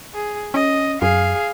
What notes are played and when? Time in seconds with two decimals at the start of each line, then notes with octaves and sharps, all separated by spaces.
0.14 G#4
0.54 C#4 D#5
1.02 F#2 G#4 F5